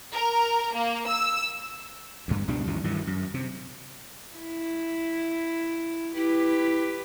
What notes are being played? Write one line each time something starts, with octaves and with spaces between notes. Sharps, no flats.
A#4
A#3
E6
D2 G2
C#2 B2 G3 D4
C#2 F#2 D#3 E3
G2 D#3 E3 F#3
F#2
C3
E4
E4 G4 B4